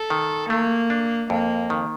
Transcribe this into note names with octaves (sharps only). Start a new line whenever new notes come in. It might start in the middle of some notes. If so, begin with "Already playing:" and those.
Already playing: A4
D#3
A3 A#3
D4
F2 A#3
D#3